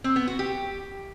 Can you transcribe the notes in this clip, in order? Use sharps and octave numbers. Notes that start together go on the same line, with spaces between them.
C4
B3
F#4
G4